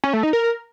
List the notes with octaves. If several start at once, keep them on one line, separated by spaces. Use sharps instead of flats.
C#4
A3
D#4
A#4